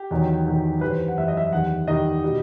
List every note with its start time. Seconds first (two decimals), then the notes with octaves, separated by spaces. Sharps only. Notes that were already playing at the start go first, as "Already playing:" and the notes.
Already playing: G4
0.11 E2 D#3 F#3
0.47 E2 D#3 F#3
0.81 F#2 E3 G3 B4
0.90 C5
1.08 F#5
1.17 F#2 E3 G3 E5
1.28 D#5
1.37 E5
1.53 E2 D#3 G3 F#5
1.88 E2 D#3 G3 D#5
2.24 B2 G3